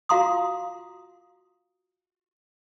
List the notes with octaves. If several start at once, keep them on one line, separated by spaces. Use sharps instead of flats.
F4 F#4 F5 A#5 C6 D#6